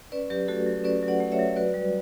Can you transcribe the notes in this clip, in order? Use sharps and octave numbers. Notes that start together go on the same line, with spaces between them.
C#4 B4 D5
F#3 G4 B4
A3 F#4 A4
F#3
C#4 B4 D5
F#3
D5 F#5
A3
C#5 E5
F#3
F#4 B4 D5
G3